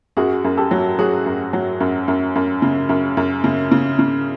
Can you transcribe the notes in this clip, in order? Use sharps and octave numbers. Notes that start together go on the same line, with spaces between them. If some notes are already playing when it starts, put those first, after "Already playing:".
F#2 F#4 G#4
F#2
G4 A4
F#3
F#3 F#4 G#4
F#2
F#3
F#2
F#2
F#2
C#3
F#2
F#2
C#3
C#3
C#3